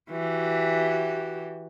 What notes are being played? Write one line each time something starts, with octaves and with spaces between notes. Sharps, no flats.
E3 F#4 G4